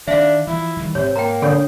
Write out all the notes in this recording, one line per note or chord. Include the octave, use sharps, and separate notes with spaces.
D#3 D4 E5 F5
E3 F3 E4
D#3 E3 G3
G#2 C3 C#5
A#3 G5 A#5
D3 A4 C#5